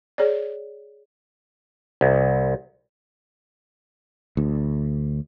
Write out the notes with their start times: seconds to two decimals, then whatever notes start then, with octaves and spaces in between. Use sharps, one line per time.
0.18 G#4 C#5 D5
2.01 C2
4.37 D2